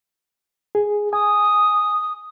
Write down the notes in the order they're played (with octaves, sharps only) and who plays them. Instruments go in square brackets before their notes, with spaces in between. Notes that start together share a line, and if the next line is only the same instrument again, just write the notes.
[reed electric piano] G#4
[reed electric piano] G#5 [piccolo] D#6